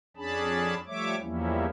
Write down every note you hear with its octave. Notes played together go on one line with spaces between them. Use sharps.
F2 C#4 D4 G#4 A5 B5
F3 G3 A3 C#5 E5 D6
E2 F3 G3 A#3 C#4 E4